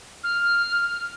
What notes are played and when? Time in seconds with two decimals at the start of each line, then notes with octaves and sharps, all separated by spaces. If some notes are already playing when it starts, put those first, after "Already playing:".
0.24 F6